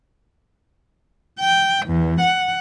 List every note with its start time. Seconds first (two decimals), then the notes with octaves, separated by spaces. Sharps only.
1.39 G5
1.87 E2
2.21 F#5